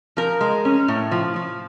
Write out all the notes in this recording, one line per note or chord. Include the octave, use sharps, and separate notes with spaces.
F3 A#4
G#3
C#4
A2
F3
F3